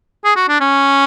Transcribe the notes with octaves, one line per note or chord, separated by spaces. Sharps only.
G#4
F#4
D4
C#4